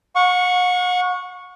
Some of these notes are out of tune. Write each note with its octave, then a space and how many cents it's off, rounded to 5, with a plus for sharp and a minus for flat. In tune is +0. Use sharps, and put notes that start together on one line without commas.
F#5 -40 C#6 +0